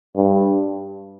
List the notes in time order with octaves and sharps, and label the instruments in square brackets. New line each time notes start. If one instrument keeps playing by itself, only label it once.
[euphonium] G2